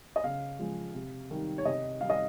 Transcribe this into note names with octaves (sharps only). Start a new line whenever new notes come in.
D#5
C#3 F5
F3 G#3
C3
D#3 G3
C#5
C3 D#5
D#3 G3 F5
D#5